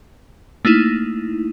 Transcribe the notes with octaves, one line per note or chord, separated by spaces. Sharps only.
A3 A#3 D#4 E4